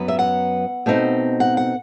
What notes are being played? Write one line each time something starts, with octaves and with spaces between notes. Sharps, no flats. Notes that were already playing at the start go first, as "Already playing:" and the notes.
Already playing: F#2 F#3 B3
E5
F#5
B2 A3 C4 D#4
F#5
F#5